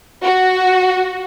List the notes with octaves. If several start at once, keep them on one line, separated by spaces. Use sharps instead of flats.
F#4